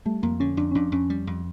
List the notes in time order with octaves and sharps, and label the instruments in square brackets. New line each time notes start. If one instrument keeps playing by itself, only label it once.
[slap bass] G3 [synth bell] A3
[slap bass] F2 [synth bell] A#3
[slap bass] D3 [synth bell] C#4
[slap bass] F2 [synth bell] D4
[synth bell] C#4
[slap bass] F2 [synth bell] D4
[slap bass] F2 [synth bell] C#4
[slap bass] G3
F2